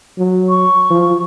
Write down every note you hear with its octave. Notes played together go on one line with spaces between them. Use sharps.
F#3
C#6
F3